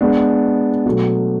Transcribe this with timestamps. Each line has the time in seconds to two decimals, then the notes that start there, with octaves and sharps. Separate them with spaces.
0.01 G#3 B3 D4
0.86 B2 F#3 A3